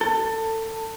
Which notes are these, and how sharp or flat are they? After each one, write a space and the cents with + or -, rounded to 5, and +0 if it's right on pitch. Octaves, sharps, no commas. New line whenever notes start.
A4 +25